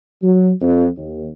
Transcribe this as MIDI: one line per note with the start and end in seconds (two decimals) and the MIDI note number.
0.23 0.52 54
0.61 0.88 41
0.97 1.30 39